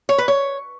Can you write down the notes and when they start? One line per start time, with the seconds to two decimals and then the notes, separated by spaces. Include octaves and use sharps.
0.09 C#5
0.18 B4
0.28 C#5